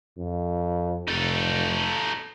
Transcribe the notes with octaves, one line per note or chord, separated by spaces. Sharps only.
F2
F1 D#4 A4